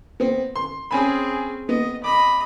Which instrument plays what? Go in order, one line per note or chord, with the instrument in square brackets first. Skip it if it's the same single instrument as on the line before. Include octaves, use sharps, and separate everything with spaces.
[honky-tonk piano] B3 C4
C6
[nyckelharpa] C4 G#4 [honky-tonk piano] C#4 G#5 B5
[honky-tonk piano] B3 [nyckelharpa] D#5
[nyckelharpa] D#5 B5 [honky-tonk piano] D6